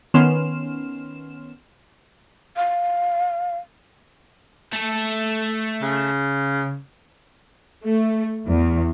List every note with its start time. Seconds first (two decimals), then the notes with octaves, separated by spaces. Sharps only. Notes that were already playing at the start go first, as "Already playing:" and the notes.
0.14 D#3 B3 C#4 C6 F6 E7
2.56 F5
4.73 A3 A4
5.82 C#3
7.85 A3
8.49 E2